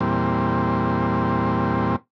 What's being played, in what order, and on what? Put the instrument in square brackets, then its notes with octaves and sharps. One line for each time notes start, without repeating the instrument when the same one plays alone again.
[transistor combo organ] E2 A#2 G3 C4